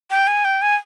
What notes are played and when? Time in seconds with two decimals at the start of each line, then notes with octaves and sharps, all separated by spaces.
0.11 G5
0.27 G#5
0.45 G5
0.62 G#5